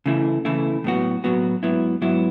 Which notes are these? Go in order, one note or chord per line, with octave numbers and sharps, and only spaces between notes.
C#3 E3 A3 E4
C#3 E3 A3 E4
A2 F#3 B3 F#4
A2 F#3 B3 F#4
G#2 F#3 B3 E4
G#2 F#3 B3 E4